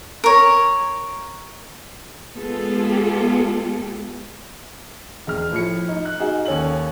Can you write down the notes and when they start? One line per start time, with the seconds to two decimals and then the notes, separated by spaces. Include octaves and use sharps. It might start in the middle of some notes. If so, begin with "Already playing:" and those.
0.24 A#4 C#5
2.36 G#3 B3 F4 G#4 A4
5.27 E1 F6
5.52 A2 F3 C#7
5.89 D#4
6.05 F#6
6.20 D#4 F#4 G#4
6.45 D#2 C#4 A4 F#7